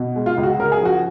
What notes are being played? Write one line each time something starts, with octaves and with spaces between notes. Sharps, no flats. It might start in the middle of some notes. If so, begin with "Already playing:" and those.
Already playing: B2
G#3
F4
C#2
F#4
C#3 A#4
G#4
F3 F#4